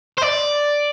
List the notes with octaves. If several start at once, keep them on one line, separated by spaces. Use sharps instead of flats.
C5
D5